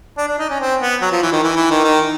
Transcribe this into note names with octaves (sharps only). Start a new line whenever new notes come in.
D4
D4
D#4
C#4
C4
B3
F#3
F3
E3
D#3
E3
E3
D#3
D#3